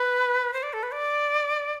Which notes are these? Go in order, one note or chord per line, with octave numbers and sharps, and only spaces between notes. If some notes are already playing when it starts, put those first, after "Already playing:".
Already playing: B4
C5
D5
A4
B4
D5